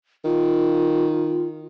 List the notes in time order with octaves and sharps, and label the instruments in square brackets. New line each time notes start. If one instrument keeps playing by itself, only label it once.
[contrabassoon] D#3 [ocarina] F4